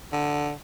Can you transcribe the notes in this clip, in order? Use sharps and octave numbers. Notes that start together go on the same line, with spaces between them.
D3